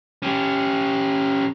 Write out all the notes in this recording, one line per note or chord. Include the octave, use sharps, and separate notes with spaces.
C#4 G4